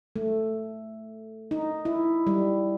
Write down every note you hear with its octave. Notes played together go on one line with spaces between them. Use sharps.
A3
D#4
E4
G3